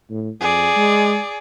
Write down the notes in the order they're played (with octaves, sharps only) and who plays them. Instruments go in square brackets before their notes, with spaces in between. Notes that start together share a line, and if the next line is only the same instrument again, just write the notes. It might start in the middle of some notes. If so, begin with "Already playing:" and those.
[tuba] A2
[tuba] F2 [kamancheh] G#4 D5
[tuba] G#3